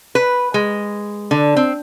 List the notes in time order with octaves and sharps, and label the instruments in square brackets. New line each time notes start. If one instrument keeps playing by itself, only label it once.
[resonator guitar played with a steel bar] B4
G#3
D3
C4